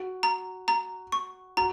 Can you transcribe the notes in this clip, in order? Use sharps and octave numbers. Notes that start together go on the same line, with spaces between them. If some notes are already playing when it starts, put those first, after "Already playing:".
Already playing: F#4
A#5
A#5
C#6
F#4 A#5